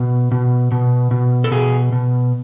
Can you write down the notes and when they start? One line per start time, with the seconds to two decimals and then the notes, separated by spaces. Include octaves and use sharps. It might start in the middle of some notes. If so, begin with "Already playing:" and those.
Already playing: B2
0.32 B2
0.72 B2
1.11 B2
1.44 A4
1.51 B2 G#4
1.92 B2